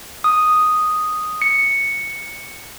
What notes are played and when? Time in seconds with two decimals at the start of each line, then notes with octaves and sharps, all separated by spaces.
0.24 D#6
1.42 C#7